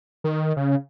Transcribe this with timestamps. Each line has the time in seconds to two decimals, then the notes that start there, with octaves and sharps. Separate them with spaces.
0.24 D#3
0.56 C#3